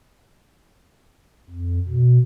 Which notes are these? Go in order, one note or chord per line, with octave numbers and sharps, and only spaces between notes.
F2
B2